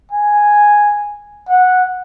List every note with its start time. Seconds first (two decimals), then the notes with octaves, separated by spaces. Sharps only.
0.11 G#5
1.49 F#5